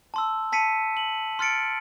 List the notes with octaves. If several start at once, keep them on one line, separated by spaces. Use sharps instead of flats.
A5 C6 E6
A5 B6 C#7 D#7
F#7
C6 F6 A6 C#7 D7